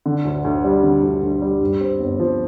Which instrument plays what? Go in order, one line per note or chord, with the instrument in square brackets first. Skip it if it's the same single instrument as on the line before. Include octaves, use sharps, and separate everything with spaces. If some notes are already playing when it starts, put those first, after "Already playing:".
[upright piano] D3
D2
D2
G3
D3
D2
D2
G3
G2
C4
G1
F3